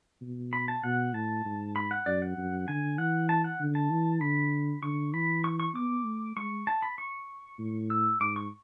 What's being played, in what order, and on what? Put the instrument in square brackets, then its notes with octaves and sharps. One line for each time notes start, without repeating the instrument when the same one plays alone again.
[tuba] B2
[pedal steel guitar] B5
A5
[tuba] B2 [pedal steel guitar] F#5
[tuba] A2 [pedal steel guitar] A5
[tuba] G#2
[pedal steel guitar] B5
F#5
[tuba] F#2 [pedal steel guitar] D5
[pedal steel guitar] F#5
[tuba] F#2
[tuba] D3 [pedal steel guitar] G#5
[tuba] E3 [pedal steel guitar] F#5
[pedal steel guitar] A5
F#5
[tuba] D3
[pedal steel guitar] A5
[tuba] E3
[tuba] D3 [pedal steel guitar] B5
[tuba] D3 [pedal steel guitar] C#6
[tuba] E3 [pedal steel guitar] B5
[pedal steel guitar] C#6
C#6
[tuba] B3 [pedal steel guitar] D6
[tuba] A3
[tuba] G#3 [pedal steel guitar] C#6
[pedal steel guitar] A5
B5
C#6
[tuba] A2
[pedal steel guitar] E6
[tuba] G#2 [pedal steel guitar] D6
[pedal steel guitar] C#6